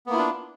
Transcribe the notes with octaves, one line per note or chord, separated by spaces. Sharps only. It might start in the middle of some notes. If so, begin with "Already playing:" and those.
A#3 B3 D4 E4 F4